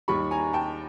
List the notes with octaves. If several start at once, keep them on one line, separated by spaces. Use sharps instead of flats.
D#2 D#3 G3 B5 C#6
G#5 A#5
G5 A5